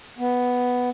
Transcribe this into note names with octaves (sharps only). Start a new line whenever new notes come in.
B3